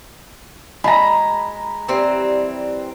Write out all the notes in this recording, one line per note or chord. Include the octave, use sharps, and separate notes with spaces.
G#3 A#5 B5
E3 G3 C4